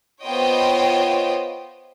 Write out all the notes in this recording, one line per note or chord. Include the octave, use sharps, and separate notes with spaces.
B3 F4 C5 C#5 D#5 G5